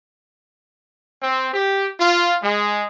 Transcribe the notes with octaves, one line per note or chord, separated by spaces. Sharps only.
C4
G4
F4
G#3